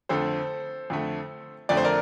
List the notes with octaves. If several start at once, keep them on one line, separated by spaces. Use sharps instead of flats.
F2 D3 A3 A4 C5
F2 D3 A3
F2 D3 A3 D5
C5
A#4 D5